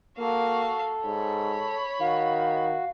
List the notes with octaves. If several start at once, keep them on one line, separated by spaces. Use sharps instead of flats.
A#3 F#4 A4 F5
G#2 C#5 B5
D#3 F#4 F5